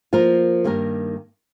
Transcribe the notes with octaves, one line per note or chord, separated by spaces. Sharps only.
F3 A#3 F4 A#4
G2 D#3 A#3 G4 A#4